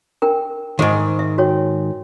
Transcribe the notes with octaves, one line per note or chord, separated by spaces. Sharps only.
D4 A#4 G5
G#2 D#3 G#4 C5 F#5
E5
F#4 C#5 G5